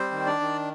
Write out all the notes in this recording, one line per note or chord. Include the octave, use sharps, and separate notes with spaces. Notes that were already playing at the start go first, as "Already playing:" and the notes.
Already playing: G3 C4 C5
D#3
D4 D5
D#3